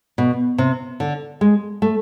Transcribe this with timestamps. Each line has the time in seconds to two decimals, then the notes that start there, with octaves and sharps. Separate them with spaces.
0.18 B2
0.58 C3
1.00 D3
1.41 G#3
1.82 A3